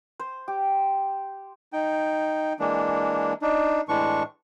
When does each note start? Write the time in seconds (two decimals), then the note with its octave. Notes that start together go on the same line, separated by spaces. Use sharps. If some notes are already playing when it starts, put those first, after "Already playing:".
0.20 C5
0.48 G4
1.73 D#4 G5
2.59 E3 G#3 A#3 D4
3.42 D4 D#4
3.89 A2 E3 G#3 D4 C#6